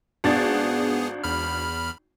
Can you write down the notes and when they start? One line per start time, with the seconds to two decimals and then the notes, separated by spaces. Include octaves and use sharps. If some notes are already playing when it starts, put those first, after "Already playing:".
0.24 G#1 B3 D4 G#4 A6
1.24 E2 B5 F6